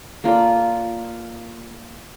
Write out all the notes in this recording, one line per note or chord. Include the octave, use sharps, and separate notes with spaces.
A#3 F4 A4 D5